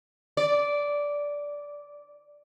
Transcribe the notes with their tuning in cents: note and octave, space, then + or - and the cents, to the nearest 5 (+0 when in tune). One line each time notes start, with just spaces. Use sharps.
D5 -10